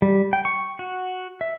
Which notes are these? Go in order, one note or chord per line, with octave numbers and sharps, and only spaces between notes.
G3
G5
C#6
F#4
E5